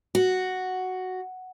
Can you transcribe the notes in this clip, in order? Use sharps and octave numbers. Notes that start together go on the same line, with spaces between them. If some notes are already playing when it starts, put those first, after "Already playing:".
F#4